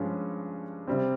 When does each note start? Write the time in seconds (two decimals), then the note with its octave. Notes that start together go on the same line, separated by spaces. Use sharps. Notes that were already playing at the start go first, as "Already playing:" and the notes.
Already playing: G2 F3 G#3 C#4
0.87 C3 G3 C4